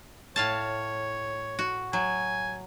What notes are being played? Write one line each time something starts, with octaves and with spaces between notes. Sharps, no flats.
A2 C#5 F5 A5
F#4
F#3 G#5